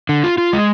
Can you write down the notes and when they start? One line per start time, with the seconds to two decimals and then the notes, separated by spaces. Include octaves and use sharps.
0.09 D3
0.24 F4
0.38 F4
0.53 G#3